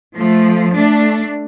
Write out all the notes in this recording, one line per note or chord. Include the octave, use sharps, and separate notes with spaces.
F3 A3
A3 D4